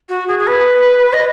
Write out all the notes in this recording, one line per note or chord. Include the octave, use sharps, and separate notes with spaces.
F#4
G#4
G#4
B4
D#5